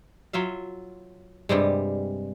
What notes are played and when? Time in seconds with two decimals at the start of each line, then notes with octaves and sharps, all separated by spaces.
0.33 F#3 F4 E5 F5
1.49 G2 C3 G3 G#3